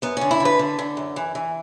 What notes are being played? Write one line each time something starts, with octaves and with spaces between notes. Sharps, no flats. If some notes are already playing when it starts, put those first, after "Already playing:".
F#2 B3
D3 C#4
E4
D3
B4
D3
D3
F#2
E3
E3